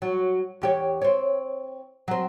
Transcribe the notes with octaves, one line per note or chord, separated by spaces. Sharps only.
F#3
E2 G4 C#5
C4 C#5
F#3 C4